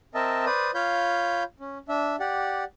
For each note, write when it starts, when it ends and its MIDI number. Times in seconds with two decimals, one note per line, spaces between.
0.15 0.45 60
0.15 0.45 70
0.15 0.45 75
0.15 0.45 76
0.15 0.45 81
0.46 0.71 71
0.46 0.71 72
0.46 0.71 74
0.46 0.71 87
0.74 1.43 65
0.74 1.43 73
0.74 1.43 77
0.74 1.43 83
0.74 1.43 91
1.60 1.78 61
1.89 2.16 62
1.89 2.16 76
2.20 2.64 67
2.20 2.64 74
2.20 2.64 78